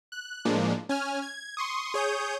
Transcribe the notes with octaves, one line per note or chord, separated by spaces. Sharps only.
F#6
A2 F3 G#3 A#3 D4
C#4 G#5 F6
G#6
C6 C#6 D#6
G#4 C#5 D#6 G6